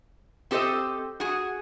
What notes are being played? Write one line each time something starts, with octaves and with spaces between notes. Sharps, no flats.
C4 G4 A4 C5 D#5
F#4 G#4